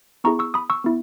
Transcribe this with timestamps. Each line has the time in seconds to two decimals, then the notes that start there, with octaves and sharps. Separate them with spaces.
0.24 B3 E4 G#4 A#5 C#6
0.39 C#6 E6
0.54 B5 D#6
0.70 C#6 E6
0.84 B3 E4